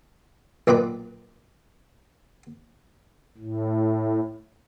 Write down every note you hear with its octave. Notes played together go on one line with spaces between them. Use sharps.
B1 A#2 C4 B4 D6
A2